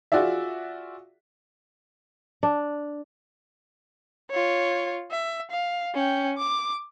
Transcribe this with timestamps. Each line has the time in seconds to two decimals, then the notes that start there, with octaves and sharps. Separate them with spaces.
0.12 F4 F#4 G#4 D5 E5
2.43 D4
4.31 F4 C#5
5.11 E5
5.51 F5
5.94 C#4 G5
6.38 D6